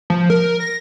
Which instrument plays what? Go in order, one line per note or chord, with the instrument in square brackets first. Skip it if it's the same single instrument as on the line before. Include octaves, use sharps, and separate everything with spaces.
[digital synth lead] F3
A#4
A#6